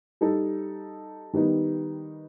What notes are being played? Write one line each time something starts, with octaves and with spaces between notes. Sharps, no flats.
G3 D#4 A4
D#3 G3 B3 D#4